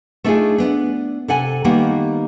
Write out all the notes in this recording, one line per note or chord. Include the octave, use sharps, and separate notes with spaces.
A3 B3 D4 D#4 F4 G#4
B3 D4
C3 A4 F#5 G#5
D#3 G3 A#3 B3 G4 F#5